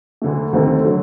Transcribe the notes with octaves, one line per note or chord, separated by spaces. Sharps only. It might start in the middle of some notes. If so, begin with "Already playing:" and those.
D2 D3 A3
D#2 D3 A3 C4
D3 F#3